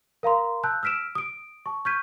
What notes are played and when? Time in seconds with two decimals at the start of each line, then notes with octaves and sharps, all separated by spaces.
0.23 A#4 F5 A#5 C6
0.63 A5 E6 F#6 G6
0.83 E6 F6 B6 D7 E7
1.15 D#6 D7
1.66 A5 C#6
1.85 C#6 F6 G6 G#6 B6 D#7